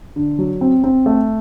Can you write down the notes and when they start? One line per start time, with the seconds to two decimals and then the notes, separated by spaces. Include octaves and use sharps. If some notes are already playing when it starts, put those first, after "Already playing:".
0.16 D3
0.39 F#3
0.61 C4
0.84 C4
1.06 A3